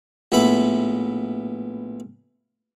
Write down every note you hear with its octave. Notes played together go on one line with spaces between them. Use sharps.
A#1 A2 B3 E5 B5